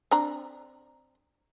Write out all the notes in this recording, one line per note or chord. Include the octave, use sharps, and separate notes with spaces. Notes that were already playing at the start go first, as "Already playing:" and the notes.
C4 D4 A#5